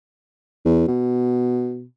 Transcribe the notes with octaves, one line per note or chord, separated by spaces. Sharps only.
E2
B2